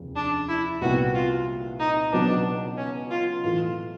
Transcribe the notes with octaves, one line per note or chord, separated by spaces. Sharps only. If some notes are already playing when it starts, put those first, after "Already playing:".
Already playing: F1 D#2 C#3
D4
E4
C2 A#2 G3 B3 F#4
F4
D#4
C#2 B2 F#3 B3 D4 D#4
C#4
F4
A2 E3 A3 F4